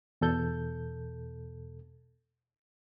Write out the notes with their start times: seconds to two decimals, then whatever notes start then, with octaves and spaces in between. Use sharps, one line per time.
0.21 E2 B2 A4 G6